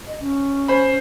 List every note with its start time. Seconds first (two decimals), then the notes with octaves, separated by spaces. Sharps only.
0.07 D#5
0.20 C#4
0.68 C5 G#5 B5